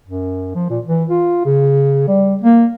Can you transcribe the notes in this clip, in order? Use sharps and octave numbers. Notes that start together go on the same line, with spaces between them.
F#2
F3
A#2
E3
F4
C#3
G3
A#3